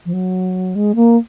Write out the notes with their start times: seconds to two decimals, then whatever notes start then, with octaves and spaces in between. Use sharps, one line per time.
0.06 F3
0.13 F#3
0.75 G#3
0.95 A#3